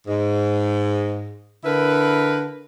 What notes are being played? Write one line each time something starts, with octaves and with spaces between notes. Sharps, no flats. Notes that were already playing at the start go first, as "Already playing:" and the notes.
G#2
D3 E4 A#4 B4